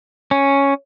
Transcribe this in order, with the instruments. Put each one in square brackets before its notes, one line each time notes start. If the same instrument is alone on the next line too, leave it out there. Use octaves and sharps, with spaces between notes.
[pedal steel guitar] C#4